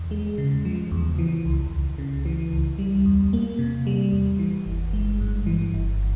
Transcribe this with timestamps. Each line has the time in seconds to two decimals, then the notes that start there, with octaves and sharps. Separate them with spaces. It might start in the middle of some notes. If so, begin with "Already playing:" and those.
Already playing: E2
0.11 G#3
0.38 C#3
0.65 F3
0.91 E2
1.19 E3
1.45 C#2
1.73 C#2
1.98 C#3
2.25 E3
2.52 C#2
2.79 G3
3.06 E2
3.33 A#3
3.59 C3
3.87 G3
4.12 E2
4.39 E3
4.66 G1
4.93 G#3
5.20 G2
5.46 E3
5.73 G1